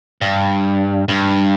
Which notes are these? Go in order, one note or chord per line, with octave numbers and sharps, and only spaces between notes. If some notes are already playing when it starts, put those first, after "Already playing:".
G2
G2